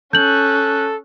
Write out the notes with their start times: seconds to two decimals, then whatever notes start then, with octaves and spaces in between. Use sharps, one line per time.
0.13 C#4 A4 F#6 G6 F#7